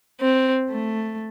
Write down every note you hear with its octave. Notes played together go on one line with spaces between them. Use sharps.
C4
A3